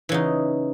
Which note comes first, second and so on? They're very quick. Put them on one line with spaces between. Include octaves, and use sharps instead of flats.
E3 C#3 D#4